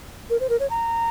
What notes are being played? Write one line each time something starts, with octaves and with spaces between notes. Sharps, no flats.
A#4
C5
A#4
C#5
A#5